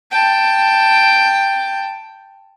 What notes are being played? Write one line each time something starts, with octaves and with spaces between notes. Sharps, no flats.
G5 A5